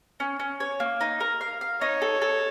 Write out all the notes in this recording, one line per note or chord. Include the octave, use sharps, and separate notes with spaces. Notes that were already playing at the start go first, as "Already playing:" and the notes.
C#4
C#4
C#5
A#3
D#4
A#4
F5
F5
D#4 C#5
A4
A4